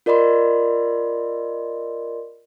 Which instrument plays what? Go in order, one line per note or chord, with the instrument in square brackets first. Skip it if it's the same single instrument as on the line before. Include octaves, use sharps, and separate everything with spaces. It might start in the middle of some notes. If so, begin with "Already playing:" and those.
[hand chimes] F4 A#4 D5 D#5 B5 C6